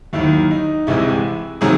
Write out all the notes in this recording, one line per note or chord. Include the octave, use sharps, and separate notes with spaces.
D#2 D#3 F#3 E4
D#4
C2 C3 E3 G#3 E4
C3 D#3 F#3 G#4